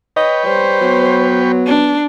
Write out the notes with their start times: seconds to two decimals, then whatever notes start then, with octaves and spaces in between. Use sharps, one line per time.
0.16 B4 C#5 D#5 G5
0.46 G3 C5
0.81 F#3 B3
1.66 D4